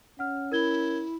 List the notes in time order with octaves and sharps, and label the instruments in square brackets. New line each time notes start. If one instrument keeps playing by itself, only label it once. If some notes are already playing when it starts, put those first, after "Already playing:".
[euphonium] C#4 [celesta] F#5 F6
[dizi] E4 [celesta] A#4 G#6 G7